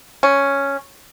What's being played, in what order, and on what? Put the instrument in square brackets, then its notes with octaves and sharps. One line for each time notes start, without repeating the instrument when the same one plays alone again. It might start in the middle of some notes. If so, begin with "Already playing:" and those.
[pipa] C#4